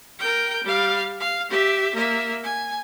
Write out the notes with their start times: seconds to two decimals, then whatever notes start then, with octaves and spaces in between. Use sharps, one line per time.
0.20 A#4 G5
0.64 G3 F5
1.20 F5
1.50 G4 E5
1.95 A#3 E5
2.44 G#5